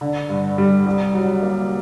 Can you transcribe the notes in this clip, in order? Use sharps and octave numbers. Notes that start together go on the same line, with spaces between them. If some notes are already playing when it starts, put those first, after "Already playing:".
D3
G2
G3
C2
F#3
A#3